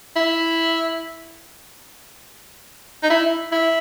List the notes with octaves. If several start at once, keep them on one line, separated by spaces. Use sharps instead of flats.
E4
D#4
E4
E4